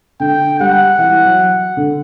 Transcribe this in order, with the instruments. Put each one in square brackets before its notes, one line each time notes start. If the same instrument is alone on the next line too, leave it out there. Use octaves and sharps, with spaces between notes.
[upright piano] D3 [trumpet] G5
[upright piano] G3 [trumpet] F#5
[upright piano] E3
F#3
D3